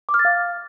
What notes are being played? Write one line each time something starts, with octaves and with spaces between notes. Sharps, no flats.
D6
F6
A6
F5